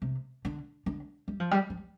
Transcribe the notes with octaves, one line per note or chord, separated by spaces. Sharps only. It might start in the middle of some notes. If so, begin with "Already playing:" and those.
C3
D3
D3
G3
F3
G3
F3